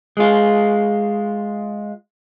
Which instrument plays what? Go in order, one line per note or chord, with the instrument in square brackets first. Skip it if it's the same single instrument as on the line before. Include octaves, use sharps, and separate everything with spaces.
[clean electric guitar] G#3 F4